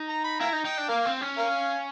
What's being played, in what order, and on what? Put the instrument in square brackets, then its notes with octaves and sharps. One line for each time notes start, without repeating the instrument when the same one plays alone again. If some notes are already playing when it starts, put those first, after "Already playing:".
Already playing: [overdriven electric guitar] D#4
[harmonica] A#5
B5
[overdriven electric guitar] E4 [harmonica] F5 G5 A#5
[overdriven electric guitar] D#4
[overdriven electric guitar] D#4 [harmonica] G5
[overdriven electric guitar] D4
[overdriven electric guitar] A#3 [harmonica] A#4 F5
[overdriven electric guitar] C4
C#4
[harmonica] A#4 F5